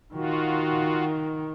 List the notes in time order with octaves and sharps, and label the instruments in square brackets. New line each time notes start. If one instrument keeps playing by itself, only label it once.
[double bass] D#3 [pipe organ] F4 F#4